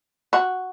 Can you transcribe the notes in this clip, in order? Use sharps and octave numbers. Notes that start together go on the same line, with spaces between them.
F#4